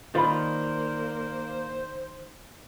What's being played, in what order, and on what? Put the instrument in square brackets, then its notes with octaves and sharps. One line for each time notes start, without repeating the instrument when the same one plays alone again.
[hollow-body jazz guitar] D#3 F4 [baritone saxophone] A#3 [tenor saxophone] C5 [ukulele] D5 F5 B5